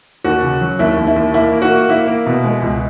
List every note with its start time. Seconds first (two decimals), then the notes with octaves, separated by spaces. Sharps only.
0.24 D#2 F#4
0.43 C#3
0.61 F#3
0.79 D#2 E4
0.98 D#2
1.07 E4
1.16 D#2
1.34 A#3 E4
1.52 A#3
1.62 F#4
1.71 A#3
1.89 A#3 E4
2.07 A#3
2.26 B2
2.44 G#3
2.62 C#2